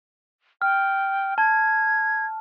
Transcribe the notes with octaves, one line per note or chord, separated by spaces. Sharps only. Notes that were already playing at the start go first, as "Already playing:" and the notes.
G5 F6
A5 G#6